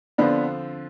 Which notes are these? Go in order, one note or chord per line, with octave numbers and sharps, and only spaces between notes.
D3 F3 B3 C4 D4 F4